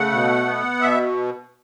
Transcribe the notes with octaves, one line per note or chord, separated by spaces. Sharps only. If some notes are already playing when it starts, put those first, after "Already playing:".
Already playing: C#3 A3 F#5
B2
B3
B2 E5